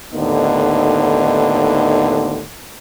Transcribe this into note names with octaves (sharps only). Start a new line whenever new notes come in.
D#2 A2 D3 B3 D#4